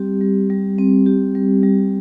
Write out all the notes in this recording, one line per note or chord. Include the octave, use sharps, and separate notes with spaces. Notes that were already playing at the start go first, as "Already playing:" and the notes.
Already playing: G3 C4 G4
G3
G3
C4
G4
G3
G3